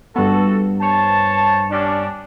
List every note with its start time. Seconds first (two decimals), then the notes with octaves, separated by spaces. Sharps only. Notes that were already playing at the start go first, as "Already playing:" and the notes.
0.16 G2 B3 F#4 A4
0.80 C5 C#5 A5
1.71 G3 C#4 D4